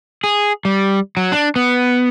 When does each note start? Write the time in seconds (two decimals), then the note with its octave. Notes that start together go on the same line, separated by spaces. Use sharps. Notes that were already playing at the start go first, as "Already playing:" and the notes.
0.24 G#4
0.65 G3
1.17 F#3
1.32 D4
1.56 B3